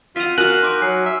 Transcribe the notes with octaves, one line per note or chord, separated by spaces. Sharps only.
F4 E5 F#5 B6 D#7 F7
F#4 A#4 D#5 F5 G#5 F6 F#6
D#4 C6 D6 D7
F#3 G#5 C7
E5